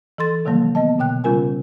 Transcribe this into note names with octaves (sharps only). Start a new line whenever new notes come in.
E3 A4 C6 A6
C3 D#3 E3 F#3 G3 A#3
B3 D#5 A5
B2 D3 G5 F#6
C#3 G3 C#4 F4 A#4 G#5